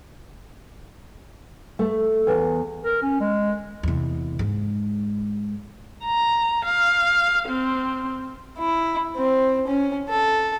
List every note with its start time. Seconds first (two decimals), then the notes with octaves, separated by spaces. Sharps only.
1.79 A3
2.27 E2
2.84 A#4
3.02 C#4
3.20 G#3
3.83 E2 C3
4.39 G#2 G#3
6.04 A#5
6.65 F5
7.49 C4
8.59 E4
9.16 C4
9.67 C#4
10.09 A4